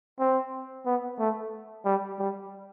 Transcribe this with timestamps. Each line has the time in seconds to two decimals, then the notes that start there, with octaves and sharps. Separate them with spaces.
0.20 C4
0.86 B3
1.20 A3
1.85 G3
2.19 G3